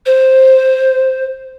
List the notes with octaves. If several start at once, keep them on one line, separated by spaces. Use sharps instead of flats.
C5